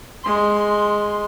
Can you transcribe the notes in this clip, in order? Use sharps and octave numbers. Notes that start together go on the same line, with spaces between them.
G#3 C6